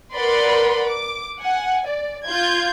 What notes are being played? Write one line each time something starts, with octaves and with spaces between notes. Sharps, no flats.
A#4 B4 D5 F#5 B5 C6
D6
F#5 G#5
D5
F4 G6 G#6